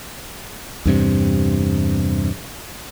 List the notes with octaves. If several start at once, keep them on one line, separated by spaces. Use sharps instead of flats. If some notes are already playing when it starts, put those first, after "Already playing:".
E2 G2 C3